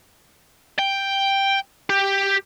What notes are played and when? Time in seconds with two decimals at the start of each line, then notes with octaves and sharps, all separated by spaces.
0.79 G5
1.90 G4